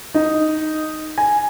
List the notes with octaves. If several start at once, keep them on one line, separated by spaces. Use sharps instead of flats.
D#4
G#5